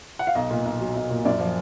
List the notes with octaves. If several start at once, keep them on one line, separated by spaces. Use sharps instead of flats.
F#5
F5
B1 D#5
A#2
B1
F#3
B1
A#2
F#2 D5
F3